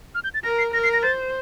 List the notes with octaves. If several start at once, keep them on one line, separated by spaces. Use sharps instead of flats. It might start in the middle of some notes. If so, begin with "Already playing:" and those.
F6
G6
A6
A#4 A#6
C7
A#4 A#6
C7
A#6
C5 A6